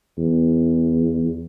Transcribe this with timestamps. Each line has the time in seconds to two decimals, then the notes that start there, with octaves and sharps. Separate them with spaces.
0.18 E2